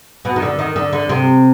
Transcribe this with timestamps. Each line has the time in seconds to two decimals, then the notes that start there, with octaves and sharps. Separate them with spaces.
0.25 B2
0.36 D#3
0.42 D3
0.59 D#3
0.76 D3
0.93 D3
1.09 C3